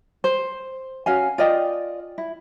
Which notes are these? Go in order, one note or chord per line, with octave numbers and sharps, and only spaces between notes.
C5
C#4 F#4 F5 G#5
F4 D5 D#5 G5
E4